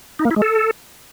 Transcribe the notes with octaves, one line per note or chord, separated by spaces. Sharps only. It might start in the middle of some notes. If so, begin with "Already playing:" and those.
D#4
A#3
E4
G#3
A4